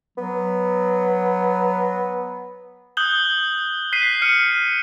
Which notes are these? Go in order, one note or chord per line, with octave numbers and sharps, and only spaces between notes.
F#3 B3
D#6 F#6 G6 F#7 G7
F#6 B6 C7 D#7
F6 C#7 D#7